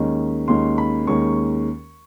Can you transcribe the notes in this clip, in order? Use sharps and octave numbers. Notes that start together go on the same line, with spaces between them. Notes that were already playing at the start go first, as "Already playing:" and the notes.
Already playing: D#2 D#3 G#3 C#4
D#2 D#3 G#3 C#4 C6
B5
D#2 D#3 G#3 C#4 C#6